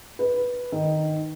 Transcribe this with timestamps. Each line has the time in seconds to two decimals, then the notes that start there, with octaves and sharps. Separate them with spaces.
0.19 B4
0.72 D#3